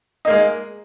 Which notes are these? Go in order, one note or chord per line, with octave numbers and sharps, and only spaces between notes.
G#3 A#3 D#4